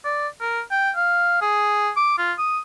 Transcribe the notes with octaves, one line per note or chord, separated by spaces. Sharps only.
D5
A#4
G5
F5
G#4
D6
F4
D#6